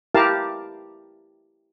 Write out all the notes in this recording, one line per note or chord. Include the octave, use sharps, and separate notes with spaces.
E4 G4 A#4 F5 A5